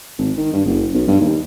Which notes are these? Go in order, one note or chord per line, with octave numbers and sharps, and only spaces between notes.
G#1
D#3
G2
F#1
B1
G2
D#2